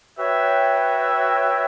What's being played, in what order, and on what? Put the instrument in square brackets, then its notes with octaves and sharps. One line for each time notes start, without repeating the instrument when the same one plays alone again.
[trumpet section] F#4 B4 E5 G5 [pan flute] C#5